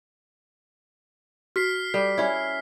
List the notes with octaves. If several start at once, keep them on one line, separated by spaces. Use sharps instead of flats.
F#4 F6 B6 C7
G3 A4
C#4 E4 D5